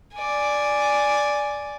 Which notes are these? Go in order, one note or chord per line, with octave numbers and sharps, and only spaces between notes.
D5 G#5